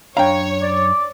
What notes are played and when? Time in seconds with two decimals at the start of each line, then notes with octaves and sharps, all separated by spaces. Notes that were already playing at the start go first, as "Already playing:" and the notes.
0.17 F#2 D4 C#5 F5 G5 A#5
0.62 D5